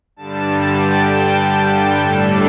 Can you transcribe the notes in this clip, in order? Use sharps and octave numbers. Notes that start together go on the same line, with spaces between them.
G2 D3 G3 A5
A5
G5
A2 G3 D4 A4